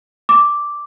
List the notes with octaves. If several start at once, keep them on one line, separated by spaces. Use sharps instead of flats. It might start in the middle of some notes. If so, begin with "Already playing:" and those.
D6